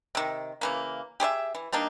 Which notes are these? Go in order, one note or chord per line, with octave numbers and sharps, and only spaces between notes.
C3 D#3
C#3 E3 A#3
G4 G#4 C#5 E5
E3
G3 A#3 D4 D#4